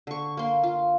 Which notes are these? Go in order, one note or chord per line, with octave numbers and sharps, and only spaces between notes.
D3 C#6
A#3 C6
F4